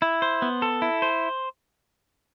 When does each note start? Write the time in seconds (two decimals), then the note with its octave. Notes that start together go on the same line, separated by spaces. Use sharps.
0.02 E4
0.22 C5
0.42 B3
0.62 A4
0.82 E4
1.02 C5